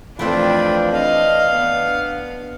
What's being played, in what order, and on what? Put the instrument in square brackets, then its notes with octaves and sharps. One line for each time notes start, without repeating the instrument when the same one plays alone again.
[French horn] F2 [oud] E3 A3 C4 [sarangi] D4 [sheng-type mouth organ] F4 G5 B5
[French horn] D4 [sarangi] D#5 [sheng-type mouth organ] F5
[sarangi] B3